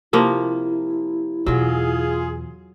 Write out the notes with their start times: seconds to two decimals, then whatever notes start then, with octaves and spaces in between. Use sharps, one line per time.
0.13 C3 F3 A#3 E4
1.46 E2 B2 F#3 F4 G#4